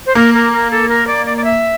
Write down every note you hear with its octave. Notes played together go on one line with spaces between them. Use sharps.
C5
A#3 A#4
A#4
A#4
A4
A#4
D5
D5
D5
E5